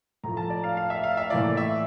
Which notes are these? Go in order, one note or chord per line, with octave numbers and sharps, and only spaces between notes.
A2 F3 A3 A#5
A5
D5
F5
F5
E5
F5
E5
A2 E3 A#3 D5
E5